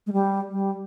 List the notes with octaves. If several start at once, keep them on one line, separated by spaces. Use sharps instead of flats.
G#3
G3
G3